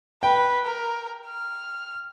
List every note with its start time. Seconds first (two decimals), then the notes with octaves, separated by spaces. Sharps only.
0.23 B4 G5
0.65 A#4
1.27 F6